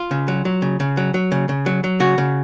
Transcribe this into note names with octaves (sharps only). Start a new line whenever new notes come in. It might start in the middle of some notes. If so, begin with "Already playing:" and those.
Already playing: F4
C#3
F#3
F#3
C#3
C#3
F#3
F#3
C#3
C#3
F#3
F#3
C#3 F#4
C#3